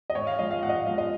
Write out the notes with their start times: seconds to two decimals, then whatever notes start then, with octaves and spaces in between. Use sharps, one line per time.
0.10 D#5
0.15 G#2 C#5
0.27 F5
0.39 F3 G#3 D#5
0.51 F5
0.63 G#2 F#5
0.69 D#5
0.75 F5
0.86 F3 G#3 F5
0.98 D#5